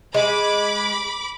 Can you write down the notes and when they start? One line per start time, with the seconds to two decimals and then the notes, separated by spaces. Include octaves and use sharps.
0.14 G#3 B5 D6